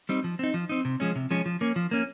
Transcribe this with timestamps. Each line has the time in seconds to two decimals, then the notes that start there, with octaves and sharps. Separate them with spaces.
0.09 G3 C4 D#4
0.24 F3
0.39 C4 D#4
0.54 F3
0.69 C4 D#4
0.85 C3
1.00 F3 G#3 C#4
1.16 C3
1.31 F3 G#3 C#4
1.46 F3
1.61 A#3 C#4
1.76 F3
1.91 A#3 C#4